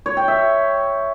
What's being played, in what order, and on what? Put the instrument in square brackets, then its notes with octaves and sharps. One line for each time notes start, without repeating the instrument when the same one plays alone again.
[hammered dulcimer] C#5
G5
E5